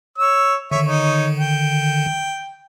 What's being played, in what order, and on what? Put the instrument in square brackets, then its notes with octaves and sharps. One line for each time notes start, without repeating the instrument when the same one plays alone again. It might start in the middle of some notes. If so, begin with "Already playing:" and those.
[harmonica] C#5 E6
[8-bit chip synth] D3 D#3 [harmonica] C#5 E5
[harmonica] D#4 C#5
G5